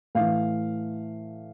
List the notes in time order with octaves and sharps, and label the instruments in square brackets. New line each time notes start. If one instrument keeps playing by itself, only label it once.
[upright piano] A2 E3 F5